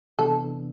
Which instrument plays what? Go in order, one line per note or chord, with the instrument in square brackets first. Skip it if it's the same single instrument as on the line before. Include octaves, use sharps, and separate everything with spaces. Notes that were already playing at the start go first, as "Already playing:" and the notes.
[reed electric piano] C3 E3 B3 D4 [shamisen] A4